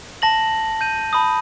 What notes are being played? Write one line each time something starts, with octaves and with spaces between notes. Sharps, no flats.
A5 A#6 F#7
G6 D#7
A5 B5 D#6